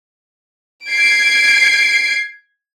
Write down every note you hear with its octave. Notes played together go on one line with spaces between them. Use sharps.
G#6 C7 D7